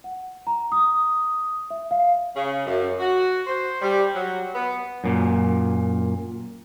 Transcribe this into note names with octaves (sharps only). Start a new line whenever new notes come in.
F#5
A#5
D#6
E5
F5
C#3
F#2
F#4
C5
G3
F#3
B3
F#2 A#2